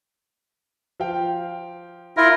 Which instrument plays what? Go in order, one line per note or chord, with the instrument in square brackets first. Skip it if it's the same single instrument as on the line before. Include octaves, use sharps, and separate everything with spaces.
[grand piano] F3 F5 G5
[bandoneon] E4 F4 [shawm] A#4